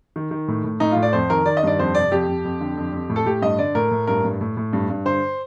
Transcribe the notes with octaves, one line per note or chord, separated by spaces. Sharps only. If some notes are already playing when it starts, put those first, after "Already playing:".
D#3
D#3
A2
A2
A2 D#4
A2 F4
D5
F2 C5
D#3 A#4
D#3 D5
D#5
G2 D5
F2 C5
C3 D5
F2 G4
F2
F2
D3
F2
F2
A2
A4
A2 G4
G2 D#5
D3 D5
A2 A#4
A2
G2 A#4
G2
A2
A2
G2
G2
D3 C5